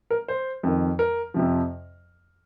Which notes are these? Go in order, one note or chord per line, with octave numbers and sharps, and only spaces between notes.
A#4
C5
F2 D#3
A#4
F2 C3 F3